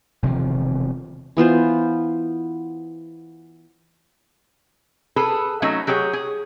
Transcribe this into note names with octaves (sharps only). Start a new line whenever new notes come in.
E1 C3 D#3 F3
E3 B3 F4 C5
G#4 A4 B4
F#3 A3 C#4 D#4
F#3 G4 G#4 C#5
G#4